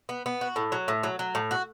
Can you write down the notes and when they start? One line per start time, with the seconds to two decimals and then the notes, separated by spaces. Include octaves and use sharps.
0.09 B3
0.26 B3
0.41 F#4
0.56 A2
0.72 F#3
0.88 A2
1.03 F#3
1.19 F#3
1.35 A2
1.51 F#4